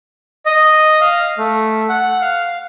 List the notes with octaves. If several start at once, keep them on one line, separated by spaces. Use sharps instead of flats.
D#5
F5
A3
F#5
F5